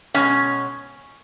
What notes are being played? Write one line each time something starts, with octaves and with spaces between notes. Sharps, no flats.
B2 G#3 C#4